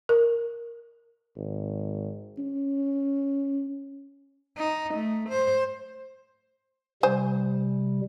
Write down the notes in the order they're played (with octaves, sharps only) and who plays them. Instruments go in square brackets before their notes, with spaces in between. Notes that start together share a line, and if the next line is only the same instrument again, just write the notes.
[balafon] A#4
[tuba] G#1
C#4
[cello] D#4
A3
C5
[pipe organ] C3 G3 [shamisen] C5 G#5